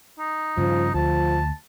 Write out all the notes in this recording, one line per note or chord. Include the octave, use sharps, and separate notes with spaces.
D#4
G2 C#3 F3
D2 F3 A5